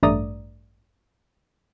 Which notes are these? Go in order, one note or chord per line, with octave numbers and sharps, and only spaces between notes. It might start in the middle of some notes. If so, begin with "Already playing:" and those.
A1 G2 A3 D5 A#5 D#6